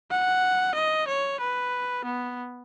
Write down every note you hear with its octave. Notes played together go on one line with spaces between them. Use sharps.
F#5
D#5
C#5
B4
B3